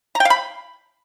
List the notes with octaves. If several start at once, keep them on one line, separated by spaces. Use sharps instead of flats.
A#5
G5
F5
B5